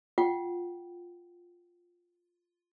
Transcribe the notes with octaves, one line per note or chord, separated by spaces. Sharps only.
F4 F#5 G5